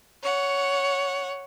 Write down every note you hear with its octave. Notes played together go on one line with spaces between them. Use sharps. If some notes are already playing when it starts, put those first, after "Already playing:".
C#5 F#5